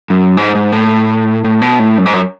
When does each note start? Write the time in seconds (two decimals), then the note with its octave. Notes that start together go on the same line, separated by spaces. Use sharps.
0.10 F#2
0.37 G#2
0.55 G#2
0.72 A2
1.44 A2
1.62 B2
1.79 A2
1.98 F#2
2.06 G#2
2.13 F#2